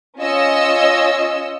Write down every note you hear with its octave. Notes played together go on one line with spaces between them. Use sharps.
C#4 F4 C#5 D#5 E6